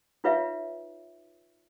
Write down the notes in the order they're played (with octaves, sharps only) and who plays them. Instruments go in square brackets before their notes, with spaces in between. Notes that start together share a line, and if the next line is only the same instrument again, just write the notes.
[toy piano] D#4 F4 B4 C#5 E5 F5